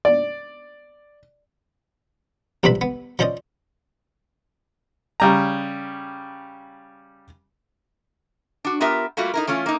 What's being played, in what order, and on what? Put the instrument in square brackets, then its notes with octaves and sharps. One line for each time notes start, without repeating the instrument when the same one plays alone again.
[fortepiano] D5
[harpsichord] A#1 C3 G3 C4 B4 B5
B3
F3 C#4 C5 D5 D#5
[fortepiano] C#3 G3 A#5
[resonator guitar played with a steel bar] D4 F#4
B3 F4 G4 A#4 E5
G3 A3 A#3 F4 F#4
D#4 E4 A#4
E3 A3 C#4 F4
A#3 D#4